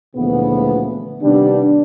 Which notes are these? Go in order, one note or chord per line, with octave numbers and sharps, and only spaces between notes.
D2 A#2 C#3 E3 F3 B3
C3 D#3 G3 B3 D4